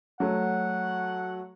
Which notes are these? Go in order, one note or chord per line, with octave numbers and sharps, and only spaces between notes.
F#3 A3 F#5